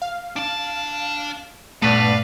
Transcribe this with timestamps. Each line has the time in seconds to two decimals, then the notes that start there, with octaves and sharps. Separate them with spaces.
0.02 F5
0.36 D4 A5
1.82 G2 A#2 A3 B3 D4 B4 F5 A5